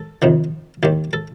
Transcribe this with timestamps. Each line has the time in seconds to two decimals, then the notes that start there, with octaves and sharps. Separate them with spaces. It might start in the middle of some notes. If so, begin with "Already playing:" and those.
Already playing: A4
0.22 F2 C3 D#3
0.83 D#2 D#3 G4
1.13 A4